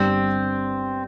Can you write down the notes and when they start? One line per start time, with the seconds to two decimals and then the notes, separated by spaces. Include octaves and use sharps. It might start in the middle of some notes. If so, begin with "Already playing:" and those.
Already playing: G1 G2 G3 C4